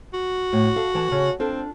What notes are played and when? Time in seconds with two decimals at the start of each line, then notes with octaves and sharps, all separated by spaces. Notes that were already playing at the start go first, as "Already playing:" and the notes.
0.14 F#4
0.53 A2
0.76 A4 F5
0.95 E3 A5
1.12 C#3
1.40 C4 D4 F4 A4